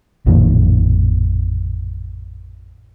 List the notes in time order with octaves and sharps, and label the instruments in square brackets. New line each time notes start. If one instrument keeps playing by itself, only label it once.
[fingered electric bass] A1 F2 A#2 D#3